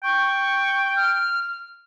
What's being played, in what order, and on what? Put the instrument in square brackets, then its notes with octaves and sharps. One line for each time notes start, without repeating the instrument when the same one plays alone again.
[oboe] G5 [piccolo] C#6
[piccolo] F6